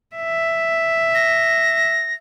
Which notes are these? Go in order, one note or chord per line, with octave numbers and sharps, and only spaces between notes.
E5
A#6